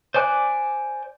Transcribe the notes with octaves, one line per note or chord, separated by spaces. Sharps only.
C5 D5 G#5 D6 F#6